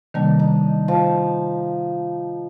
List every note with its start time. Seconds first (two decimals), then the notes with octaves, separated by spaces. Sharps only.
0.14 C3 D#3 G3 A#3 D4
0.39 D#4
0.88 F3